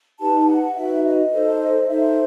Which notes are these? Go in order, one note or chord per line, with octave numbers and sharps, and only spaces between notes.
D#4 G4 B4 A5
F#5
D#4 F#4 B4 E5
D#5
D#4 A4 C5
D#4 A4 C5 E5